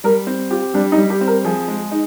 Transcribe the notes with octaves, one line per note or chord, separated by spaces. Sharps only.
G3 A#4
C4
F4 G4
G3 D4
D#4
G3
G4
C4
A#4
F3 G#4
G#3
D#4